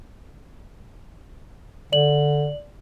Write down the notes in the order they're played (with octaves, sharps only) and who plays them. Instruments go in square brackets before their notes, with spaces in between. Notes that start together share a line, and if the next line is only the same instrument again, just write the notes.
[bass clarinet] D3 [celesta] D5 F#7